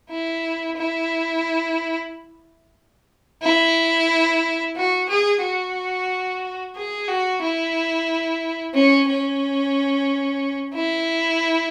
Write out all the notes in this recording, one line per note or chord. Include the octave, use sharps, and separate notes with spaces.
E4
E4
E4
F#4
G#4
F#4
G#4
F#4
E4
C#4
C#4
E4